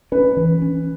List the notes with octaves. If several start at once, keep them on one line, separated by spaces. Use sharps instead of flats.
C#4 B4
E3
C#4